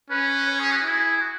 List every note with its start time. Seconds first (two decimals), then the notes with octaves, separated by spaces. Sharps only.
0.10 C#4 B4
0.47 C#5
0.60 G#4
0.71 F#4
0.84 E4 G#4
1.20 F#4